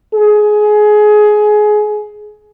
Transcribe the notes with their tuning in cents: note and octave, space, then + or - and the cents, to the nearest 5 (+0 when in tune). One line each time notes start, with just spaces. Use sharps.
G#4 +20